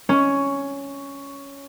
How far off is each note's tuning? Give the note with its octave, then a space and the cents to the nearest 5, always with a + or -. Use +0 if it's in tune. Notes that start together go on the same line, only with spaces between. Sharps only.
C#4 +5 C#6 +15